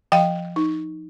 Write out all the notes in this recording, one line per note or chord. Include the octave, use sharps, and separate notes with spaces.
F3 F5 G5
D#4